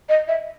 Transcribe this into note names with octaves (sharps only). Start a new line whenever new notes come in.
D#5
E5